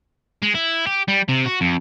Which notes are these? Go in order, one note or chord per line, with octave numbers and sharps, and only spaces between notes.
G#3
E4
G4
G3
C3
F#4
F2